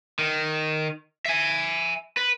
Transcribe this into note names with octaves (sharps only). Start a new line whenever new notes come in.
D#3
E5 G#5
B4